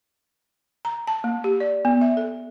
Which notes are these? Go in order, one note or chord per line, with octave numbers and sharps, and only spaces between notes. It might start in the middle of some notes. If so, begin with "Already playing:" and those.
A#5
A5
A#3
G4
D5
B3
E5
A4